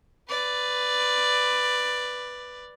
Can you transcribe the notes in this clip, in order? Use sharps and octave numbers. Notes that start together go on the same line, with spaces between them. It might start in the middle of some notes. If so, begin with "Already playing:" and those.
B4 D5